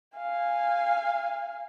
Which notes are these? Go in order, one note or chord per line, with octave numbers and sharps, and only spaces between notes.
F5 G#5